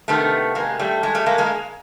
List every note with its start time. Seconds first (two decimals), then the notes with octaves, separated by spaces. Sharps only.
0.08 C3 D#3 A3 B3
0.55 G#3 A#3
0.79 G3 A3
1.03 G#3
1.15 G3 A3
1.26 G#3 A#3
1.38 G#3 A#3